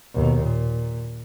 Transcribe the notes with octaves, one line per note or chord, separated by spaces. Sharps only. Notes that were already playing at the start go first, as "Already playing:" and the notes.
D#2 B2
A#2